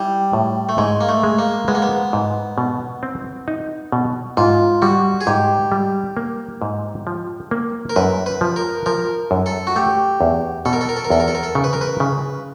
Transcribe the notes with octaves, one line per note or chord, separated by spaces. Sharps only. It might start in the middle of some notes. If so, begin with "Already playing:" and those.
Already playing: G3 E4
A2
A3
G#2 G#3
A#3
A3
G#3
A#3
G#3 B3
A#3
B3
G#2
B2
C4
D#4
B2
G#2 F4
G3 F#4
G#4
G#2 G4
G3
A#3
G#2
F3
A#3
A#4
F#2 B4
B4
F3
A#4
F3 A#4
F#2
A4
F#4
A3 G4
E2
B2 A4
A#4
A4
A#4
A4
A#4
E2 A4
A#4
A4
A#4
A4
C#3
B4
A#4
B4
C#3